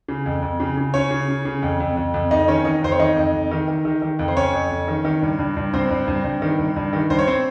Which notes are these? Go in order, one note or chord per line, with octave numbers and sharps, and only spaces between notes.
C#3
F2
F2
C#3
C#3
C#3 C#4 C#5
C#3
C#3
C#3
F2
F2
F2
F2
F2 D#4 D#5
D#3 C#4 C#5
D#3 D#4 D#5
F2 C5
C#5
D#3 D#4 D#5
F2
F2
D#3
D#3
D#3
D#3
F2
C5
F2 C#4 C#5
F2
F2
D#3
D#3
G2
G2
G2
G2 C4 C5
G2
G2
G2
D#3
G2
G2
D#3
G2 C5
C#5
C4 C5